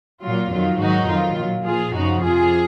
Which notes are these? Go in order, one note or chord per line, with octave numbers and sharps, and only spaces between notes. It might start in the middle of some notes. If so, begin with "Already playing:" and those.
A#2 F#3 F4
F2 D#3 F#3 F4
G#2 D#3 F#3 D#4 F#4
F2 D#3 F#3 F4
A#2 F#3
A#2 F3 F4 G#4
F#2 C#3 F3 D#4 F#4
F2 C3 F3 F4 G#4